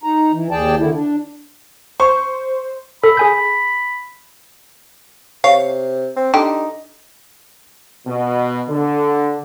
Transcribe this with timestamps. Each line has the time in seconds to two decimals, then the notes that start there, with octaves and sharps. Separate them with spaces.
0.03 D#4 A#5
0.32 E3
0.51 D#2 G#4 D5 G5 A5
0.79 D3 D#3 E4
0.93 D4
2.00 C5 C#6
3.04 A4 B5
3.17 G#4 G#5 G6
5.44 C3 C#5 F5
6.17 C4
6.34 D3 D#4 G4
8.07 B2
8.69 D3